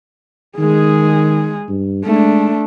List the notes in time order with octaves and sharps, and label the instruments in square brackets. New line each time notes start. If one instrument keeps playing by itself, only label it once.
[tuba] D#3 [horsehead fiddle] G#3 G#4
[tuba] G2
[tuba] G#3 [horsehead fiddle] A3 D4